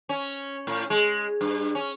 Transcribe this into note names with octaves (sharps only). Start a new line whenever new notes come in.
C#4
A2
G#3
G2
C#4